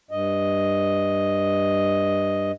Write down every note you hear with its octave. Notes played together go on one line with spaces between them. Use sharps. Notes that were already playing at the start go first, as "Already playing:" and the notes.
G2 D#5